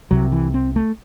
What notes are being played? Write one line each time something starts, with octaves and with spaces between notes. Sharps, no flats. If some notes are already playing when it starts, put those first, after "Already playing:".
C2 C3 F#3
E3
C4
A3